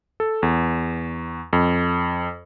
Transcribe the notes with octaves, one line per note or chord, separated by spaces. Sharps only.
A4
E2
F2